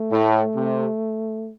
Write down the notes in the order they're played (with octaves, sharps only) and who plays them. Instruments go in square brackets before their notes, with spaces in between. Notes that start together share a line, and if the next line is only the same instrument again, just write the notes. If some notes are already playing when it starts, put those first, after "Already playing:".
Already playing: [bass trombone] A3
[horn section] A2
C3